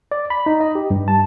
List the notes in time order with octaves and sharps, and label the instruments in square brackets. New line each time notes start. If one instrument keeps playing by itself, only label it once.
[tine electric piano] D5
B5
D#4
D#5
G4
G2
A5